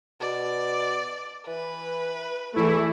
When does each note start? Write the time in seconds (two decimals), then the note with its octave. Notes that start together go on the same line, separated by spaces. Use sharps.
0.21 B2 D5
1.47 E3 B4
2.56 E2 E3 A3 E4